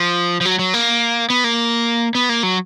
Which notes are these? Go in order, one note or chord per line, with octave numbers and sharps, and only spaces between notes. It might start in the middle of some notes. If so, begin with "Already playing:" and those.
Already playing: F3
F3
F#3
F#3
A#3
B3
A#3
B3
A#3
F#3